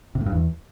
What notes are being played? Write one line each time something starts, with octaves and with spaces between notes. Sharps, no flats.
C3
A2
G2
E2